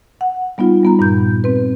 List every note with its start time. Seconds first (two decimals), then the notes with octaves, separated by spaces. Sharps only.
0.21 F#5
0.58 G3 B3 D#4 F4
0.83 G3 B3 A#5
0.99 G2 A#2 G6
1.44 C4 B4